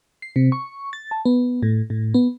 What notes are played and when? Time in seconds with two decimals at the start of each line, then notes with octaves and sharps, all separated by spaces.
0.22 C7
0.36 C3
0.52 C#6
0.93 A6
1.11 A5
1.26 B3
1.63 A2
1.90 A2
2.14 B3